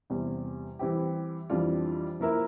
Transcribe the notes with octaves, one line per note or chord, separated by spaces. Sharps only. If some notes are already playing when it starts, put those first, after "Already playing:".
E2 C3 G3
E3 G3 C4 E4 G4
F2 E3 G3 D4 F4
F3 A#3 E4 A#4 E5